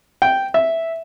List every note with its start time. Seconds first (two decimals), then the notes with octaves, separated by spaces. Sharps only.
0.22 G5
0.54 E5